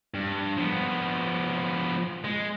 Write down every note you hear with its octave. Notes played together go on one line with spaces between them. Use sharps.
G2
F3 B3
G#3